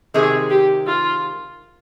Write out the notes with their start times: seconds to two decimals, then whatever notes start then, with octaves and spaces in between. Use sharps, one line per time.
0.14 C3 D#3 G#3 G#4
0.51 G4
0.87 F4